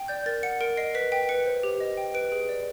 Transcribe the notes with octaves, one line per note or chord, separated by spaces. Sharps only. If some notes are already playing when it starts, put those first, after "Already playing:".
Already playing: G5
D5 G6
A#4 A6
F#5 C#7
A#4 D7
D#5 C7
B4 B6
G5 B6
B4 C#7
C5
G4
D#5
G5
B4 D7
G#4
D5